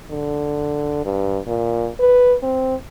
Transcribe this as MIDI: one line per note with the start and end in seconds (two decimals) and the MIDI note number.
0.11 1.02 50
1.05 1.39 43
1.47 1.89 46
1.99 2.35 71
2.43 2.75 60